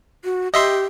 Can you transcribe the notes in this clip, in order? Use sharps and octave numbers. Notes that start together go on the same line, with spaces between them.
F#4
G4 D#5 E5 C6